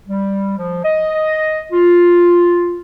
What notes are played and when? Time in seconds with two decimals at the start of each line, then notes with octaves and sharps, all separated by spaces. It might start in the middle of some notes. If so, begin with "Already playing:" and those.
0.08 G3
0.58 F3
0.84 D#5
1.72 F4